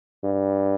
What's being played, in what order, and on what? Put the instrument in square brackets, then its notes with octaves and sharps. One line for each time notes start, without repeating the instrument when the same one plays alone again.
[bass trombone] G2